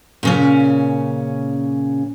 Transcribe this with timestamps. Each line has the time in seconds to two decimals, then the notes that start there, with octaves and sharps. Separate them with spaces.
0.23 A#2 C#3 C#4